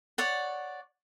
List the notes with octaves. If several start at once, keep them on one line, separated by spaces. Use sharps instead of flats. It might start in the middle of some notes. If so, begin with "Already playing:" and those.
C#5 D5 F#5